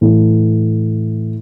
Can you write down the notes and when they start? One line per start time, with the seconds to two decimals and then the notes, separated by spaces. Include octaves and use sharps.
0.01 A2 E3 A3